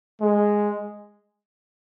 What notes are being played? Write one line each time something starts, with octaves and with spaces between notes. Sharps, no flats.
G#3